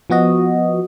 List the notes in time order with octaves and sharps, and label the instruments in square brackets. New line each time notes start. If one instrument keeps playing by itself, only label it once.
[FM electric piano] F3 B3 F#4 D#5